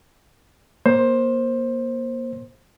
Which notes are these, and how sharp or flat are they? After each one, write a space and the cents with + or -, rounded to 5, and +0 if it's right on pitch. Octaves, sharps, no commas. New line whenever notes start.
A#3 +25 C5 +15